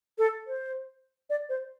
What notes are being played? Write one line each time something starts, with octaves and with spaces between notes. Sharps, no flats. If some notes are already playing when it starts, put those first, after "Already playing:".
A4
C5
D5
C5